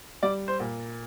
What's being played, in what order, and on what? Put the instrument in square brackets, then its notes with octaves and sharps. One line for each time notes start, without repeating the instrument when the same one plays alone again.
[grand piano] G3 D5
C5
A#2